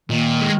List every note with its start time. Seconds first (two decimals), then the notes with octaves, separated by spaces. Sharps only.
0.10 A#2 D#3
0.41 G#3